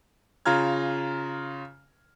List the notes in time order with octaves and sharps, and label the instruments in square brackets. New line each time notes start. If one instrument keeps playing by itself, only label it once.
[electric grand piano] C#3 F4 A#5 F6 G#6